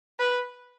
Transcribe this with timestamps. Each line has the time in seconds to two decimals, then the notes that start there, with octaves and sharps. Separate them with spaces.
0.19 B4